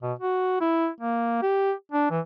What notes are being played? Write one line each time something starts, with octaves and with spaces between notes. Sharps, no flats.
B2
F#4
E4
A#3
G4
D4
E3